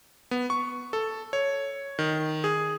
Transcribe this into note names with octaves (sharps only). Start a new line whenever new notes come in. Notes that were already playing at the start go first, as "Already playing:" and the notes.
B3
C#6
A4
C#5
D#3
G#4